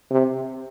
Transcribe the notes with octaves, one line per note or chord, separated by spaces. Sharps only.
C3